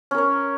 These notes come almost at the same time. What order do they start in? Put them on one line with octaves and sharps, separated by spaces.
C#4 A#4 C#5